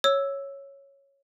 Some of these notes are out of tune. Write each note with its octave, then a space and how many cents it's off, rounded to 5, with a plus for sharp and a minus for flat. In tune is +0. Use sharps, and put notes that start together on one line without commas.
C#5 -5 E6 +0